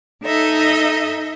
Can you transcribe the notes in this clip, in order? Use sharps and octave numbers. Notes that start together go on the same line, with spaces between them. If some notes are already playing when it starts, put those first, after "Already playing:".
D#4 A4 D#5 E5